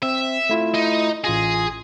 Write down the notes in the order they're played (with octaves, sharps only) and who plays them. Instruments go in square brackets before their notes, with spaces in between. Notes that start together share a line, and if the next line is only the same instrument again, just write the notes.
[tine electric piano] C4 [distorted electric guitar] E5
[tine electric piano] A3 E4 F4
[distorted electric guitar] D#4
[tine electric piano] A1 F4 A#6 [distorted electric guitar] G#4